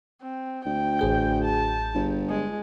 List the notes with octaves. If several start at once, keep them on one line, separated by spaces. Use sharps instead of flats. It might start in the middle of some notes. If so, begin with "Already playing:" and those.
C4
D2 G5
A1 G#4 G6
A5
G1
G#3